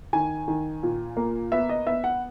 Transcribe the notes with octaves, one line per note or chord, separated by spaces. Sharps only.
D#3 G#5
D#3
A#2
A#3
B3 E5
D#5
B3 E5
F#5